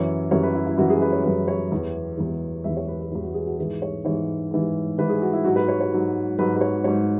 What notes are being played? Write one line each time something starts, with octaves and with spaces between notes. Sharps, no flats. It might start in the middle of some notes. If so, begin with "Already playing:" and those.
Already playing: F#2 E3 C#5
F#2 E3 C#5
B4
E4
E4
F#2 E3 F#4
G#4
B4
C#5
F#2 E3 B4
C#5
E2 E3
E2 E3
E2 E3 E5
C#5
B4
B4
E2 E3 F#4
F#4
G#4
F#4
G#2 E3 G#4
C#5
G#2 E3 C#5
G#2 E3
G#2 E3 B4
G#4
F#4
E4
G#2 F#3 F#4
B4
C#5
C#5
G#2 F#3
G#2 F#3 B4
B4
C#5
G#2 F#3 C#5